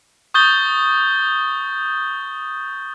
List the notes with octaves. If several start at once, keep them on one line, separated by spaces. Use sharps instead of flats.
C#6 D#6 G6 A6 G7